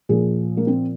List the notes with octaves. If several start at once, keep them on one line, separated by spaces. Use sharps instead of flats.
A#2 F3 G#4
A#3
C4